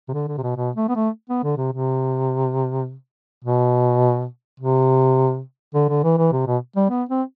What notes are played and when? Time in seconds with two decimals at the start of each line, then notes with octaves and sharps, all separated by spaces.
0.09 C3
0.13 D3
0.28 D3
0.38 C3
0.43 B2
0.57 B2
0.76 A3
0.89 B3
0.96 A3
1.30 B3
1.44 D3
1.57 C3
1.72 C3
3.44 B2
4.60 C3
5.75 D3
5.89 D3
6.04 E3
6.18 E3
6.32 C3
6.47 B2
6.76 G3
6.90 B3
7.09 C4